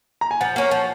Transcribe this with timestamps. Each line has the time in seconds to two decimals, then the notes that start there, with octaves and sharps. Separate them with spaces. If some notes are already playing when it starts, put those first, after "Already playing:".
0.21 A#5
0.31 G#5
0.41 F3 F#5
0.56 A#3 C#4 F#5
0.71 F3 F#5